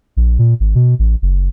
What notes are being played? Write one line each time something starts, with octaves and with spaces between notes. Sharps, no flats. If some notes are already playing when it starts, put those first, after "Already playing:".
A#1
A#2
G#1
B2
A1
F#1